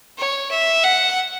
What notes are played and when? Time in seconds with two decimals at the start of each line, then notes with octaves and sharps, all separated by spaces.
0.18 C#5
0.51 E5
0.83 F#5